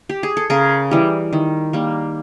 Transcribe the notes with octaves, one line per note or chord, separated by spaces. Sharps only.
G4
G#4
A4
C#3 G#4 A#4
E3 G3
D#3
G3 A#3